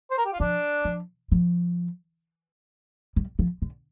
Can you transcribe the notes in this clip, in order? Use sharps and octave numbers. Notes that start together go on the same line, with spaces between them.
C5
A#4
G4
F4
F3 D4
F3
F3
G3
F3
D3